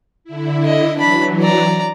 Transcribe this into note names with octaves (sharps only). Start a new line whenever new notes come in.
D3 E4
D#5
E3 F#3 D4 B5
D5 A#5